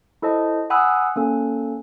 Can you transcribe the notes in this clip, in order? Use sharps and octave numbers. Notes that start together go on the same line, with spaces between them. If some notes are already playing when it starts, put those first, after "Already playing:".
E4 A4 C5 D#5 A5
F#5 G#5 B5 D#6 E6 F#6
A#3 C#4 A4